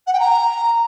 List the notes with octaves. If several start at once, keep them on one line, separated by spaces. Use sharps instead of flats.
F#5
G5
A#5